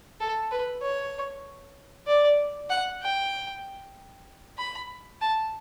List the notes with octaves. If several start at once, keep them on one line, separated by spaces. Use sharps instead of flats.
A4
B4
C#5
D5
F#5
G5
B5
A5